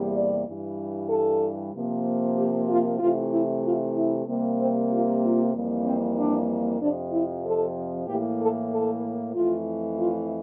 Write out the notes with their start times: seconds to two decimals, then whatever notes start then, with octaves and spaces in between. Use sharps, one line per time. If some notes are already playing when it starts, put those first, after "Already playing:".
Already playing: E2 C3 G3 A#3
0.14 D5
0.46 G2 E3 G3
1.09 A4
1.73 C3 F3 A#3
2.36 G4
2.68 F4
2.99 C3 E3 A3 F4
3.31 E4
3.63 F4
3.95 E4
4.27 C3 G3 A#3
4.58 C4
4.90 F4
5.22 F4
5.54 F2 E3 G3 A#3
5.85 C4
6.17 D4
6.80 F2 C3 F3 D4
7.12 E4
7.44 A4
8.07 A2 E3 A#3 G4
8.39 A4
8.70 A4
9.34 F2 E3 A3 F4
9.97 F4